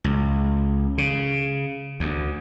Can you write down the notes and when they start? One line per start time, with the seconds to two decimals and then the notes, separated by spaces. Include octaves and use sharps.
0.04 C#2
0.98 C#3
2.00 D2